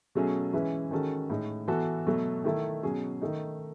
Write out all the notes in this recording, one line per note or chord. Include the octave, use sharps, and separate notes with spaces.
B2 F#3 A3 C#4 G#4
E3 G#3 C#4 E4 B4
D#3 G#3 C#4 F#4 A4
A2 G#3 D#4
E3 B3 F#4 A4
B2 F#3 A3
D#3 A3 E4 A4
B2 F#3 C#4 G#4
D#3 A3 D#4